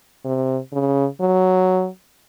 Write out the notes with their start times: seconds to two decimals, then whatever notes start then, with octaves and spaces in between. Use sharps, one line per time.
0.25 C3
0.73 C#3
1.21 F#3